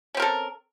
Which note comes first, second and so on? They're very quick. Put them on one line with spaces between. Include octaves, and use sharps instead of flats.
C#4 C4 A#4 A4